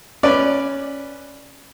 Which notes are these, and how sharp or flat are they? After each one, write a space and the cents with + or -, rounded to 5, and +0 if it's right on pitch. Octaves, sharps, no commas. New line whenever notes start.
C#4 +0 B4 +0 D5 +0